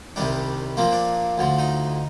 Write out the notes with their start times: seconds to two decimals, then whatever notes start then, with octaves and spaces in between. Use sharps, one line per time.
0.16 C2 C3 D#3 G3 D4
0.77 A#2 F3 A#3 C4
0.92 D4
1.38 D2 D3 F3
1.58 D#4